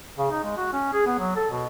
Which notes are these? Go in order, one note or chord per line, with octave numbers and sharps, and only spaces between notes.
C#3
D#4
G#3
F#4
C#4
G#4
B3
F#3
A4
B2